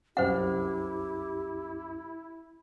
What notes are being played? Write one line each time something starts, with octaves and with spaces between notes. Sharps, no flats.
C2 F#2 C#4 E4 G4 C5 F#5